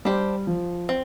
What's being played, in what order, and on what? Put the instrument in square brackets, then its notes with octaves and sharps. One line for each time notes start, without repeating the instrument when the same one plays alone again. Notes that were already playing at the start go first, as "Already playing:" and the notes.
[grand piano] G3 [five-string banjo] D4 G4 C5
[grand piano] F3
[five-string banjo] C4